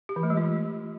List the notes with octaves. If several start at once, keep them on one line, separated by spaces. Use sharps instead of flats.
G4
E3
A3
G#3
F4